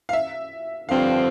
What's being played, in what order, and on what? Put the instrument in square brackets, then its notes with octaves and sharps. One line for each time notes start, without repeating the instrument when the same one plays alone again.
[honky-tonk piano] F5
E5
[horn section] G2 D3 F3 C4 [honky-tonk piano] F5